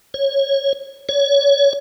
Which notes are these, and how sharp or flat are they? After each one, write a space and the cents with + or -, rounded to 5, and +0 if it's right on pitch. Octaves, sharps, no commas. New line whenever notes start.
C#5 -15
C#5 +25